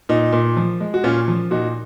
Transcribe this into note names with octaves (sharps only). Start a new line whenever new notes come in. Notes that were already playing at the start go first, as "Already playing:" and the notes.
A#2 D#4
A#2
F3
G#3
F#4
A#2 C#4 F4
F3
A#2 D#4 F#4